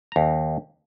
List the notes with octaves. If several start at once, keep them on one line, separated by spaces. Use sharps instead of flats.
D#2 A#5